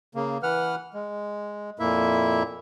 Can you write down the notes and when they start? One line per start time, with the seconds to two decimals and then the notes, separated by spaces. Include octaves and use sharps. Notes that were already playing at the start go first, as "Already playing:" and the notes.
0.15 C#3 A#3
0.43 E3 B4 F#5 F6
0.94 G#3
1.79 F2 A#2 A#3 E4 E5